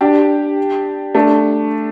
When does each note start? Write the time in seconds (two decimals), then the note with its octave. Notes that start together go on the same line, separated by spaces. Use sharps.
0.01 D4 G4
1.14 A3 D4